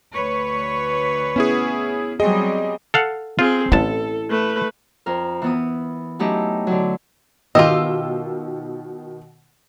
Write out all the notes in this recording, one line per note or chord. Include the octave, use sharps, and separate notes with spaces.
D2 B4 C#5
B3 C#4 E4 G#4
F#3 G3 C4 G#4 D#5
A4 F5 F#5
C4 F4 G#4
A1 E4 A4 A5
A3 B4
F2 A#4
E3 B3 D#6
F#3 A3 C#4 D#4 E4 G4
D3 F#3
B2 D#3 F4 G4 D#5 E6